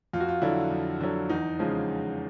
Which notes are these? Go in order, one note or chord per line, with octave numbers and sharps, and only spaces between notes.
F2 F4
F#4
F4
D3 F#3 E4
F2
D3 F#3
E2 D#4
C#3 F3 G#3